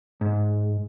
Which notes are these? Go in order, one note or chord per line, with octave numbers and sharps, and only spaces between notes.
G#2